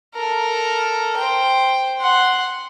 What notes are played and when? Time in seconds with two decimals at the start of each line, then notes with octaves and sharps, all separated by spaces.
0.15 A4 A#4
1.17 C5 G5
2.00 F#5 C6